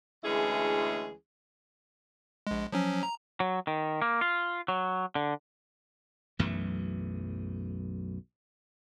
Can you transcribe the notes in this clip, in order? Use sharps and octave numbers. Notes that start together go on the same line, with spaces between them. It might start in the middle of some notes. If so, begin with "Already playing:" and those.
D2 E3 G#3 C#4 E4 G#4
A#1 G#3
F3 F#3 C#4
A#5
F#3
D#3
A#3
F4
F#3
D3
B1 F#2 E3 A3